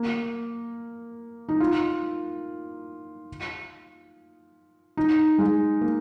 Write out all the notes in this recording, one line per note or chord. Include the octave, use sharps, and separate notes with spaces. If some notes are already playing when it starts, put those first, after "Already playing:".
Already playing: A#3
D#4
F4
D#4
G#3
A#3